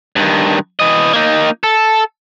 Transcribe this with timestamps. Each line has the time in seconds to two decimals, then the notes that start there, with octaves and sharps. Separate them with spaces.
0.16 G2 D#3
0.79 E3 D#5
1.13 A#3 D#4
1.64 A4